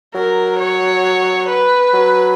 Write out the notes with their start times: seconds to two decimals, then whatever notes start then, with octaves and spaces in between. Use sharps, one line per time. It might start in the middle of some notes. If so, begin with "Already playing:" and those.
0.15 F#3 A#4
0.59 C#5
1.49 B4
1.93 F#3